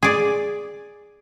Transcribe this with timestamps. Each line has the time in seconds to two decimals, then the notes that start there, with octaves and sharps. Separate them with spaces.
0.03 G#4 D5